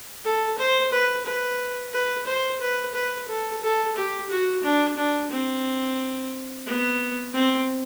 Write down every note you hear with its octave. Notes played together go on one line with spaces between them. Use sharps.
A4
C5
B4
B4
B4
C5
B4
B4
A4
A4
G4
F#4
D4
D4
C4
B3
C4